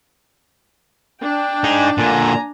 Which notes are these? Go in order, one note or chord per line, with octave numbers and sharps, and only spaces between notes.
D4 G5
D#4 G#4
A#2 D3 G#5 A#5